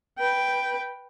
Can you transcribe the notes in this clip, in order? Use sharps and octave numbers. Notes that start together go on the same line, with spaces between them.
B4 G5